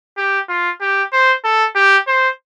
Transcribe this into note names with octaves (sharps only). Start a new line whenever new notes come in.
G4
F4
G4
C5
A4
G4
C5